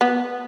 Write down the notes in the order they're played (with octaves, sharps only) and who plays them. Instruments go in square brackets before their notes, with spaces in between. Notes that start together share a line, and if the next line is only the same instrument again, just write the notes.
[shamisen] B3